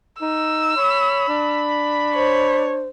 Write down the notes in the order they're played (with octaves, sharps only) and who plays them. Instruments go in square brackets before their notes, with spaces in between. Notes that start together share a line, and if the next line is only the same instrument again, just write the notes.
[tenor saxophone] D#4 [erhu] E6
[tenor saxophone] C#5 [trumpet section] B5
[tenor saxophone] D4
[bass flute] C5 [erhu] C#5